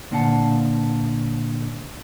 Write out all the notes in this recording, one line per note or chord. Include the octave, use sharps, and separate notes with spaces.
A#2 D3 F5 F#5 A5